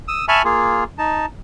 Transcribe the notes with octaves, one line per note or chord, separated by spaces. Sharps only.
D#6 E6
E5 G#5 A5 B5 C#6 F6
A#3 F4 G#4
D#4 A5